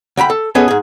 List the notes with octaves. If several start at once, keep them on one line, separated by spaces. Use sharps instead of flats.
D2 G5 A#5 B5
A4
B3 C#4 G#4 A4 D#5
G#2 G#4